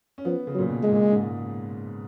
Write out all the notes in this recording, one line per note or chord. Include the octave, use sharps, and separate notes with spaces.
C#4
F3 B3
C#3
F#3
A#2
B2
G#3
A#2
G#2